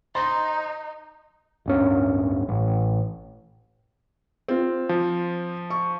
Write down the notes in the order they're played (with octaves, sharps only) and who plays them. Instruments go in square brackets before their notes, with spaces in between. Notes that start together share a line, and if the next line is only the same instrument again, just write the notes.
[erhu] D#4 [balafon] C5 A#5 [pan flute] D#5 [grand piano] C6
[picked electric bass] D1 G2 C#4
A1
[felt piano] C4 F4
[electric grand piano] F3
[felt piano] C#6